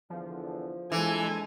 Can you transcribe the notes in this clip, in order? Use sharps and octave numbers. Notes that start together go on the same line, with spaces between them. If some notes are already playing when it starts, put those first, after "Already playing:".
E2 D3 F3
A#1 E3 G#3 A4 G#5